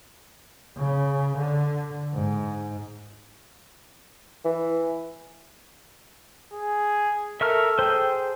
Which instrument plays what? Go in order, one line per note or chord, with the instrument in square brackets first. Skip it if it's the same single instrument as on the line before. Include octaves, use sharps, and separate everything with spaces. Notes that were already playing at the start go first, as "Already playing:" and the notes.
[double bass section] C#3
D3
G#2
[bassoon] E3
[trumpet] G#4
[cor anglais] A4 [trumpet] A#4 [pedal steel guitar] E5 C#6 F6
[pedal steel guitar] G#4 C5 [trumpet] G5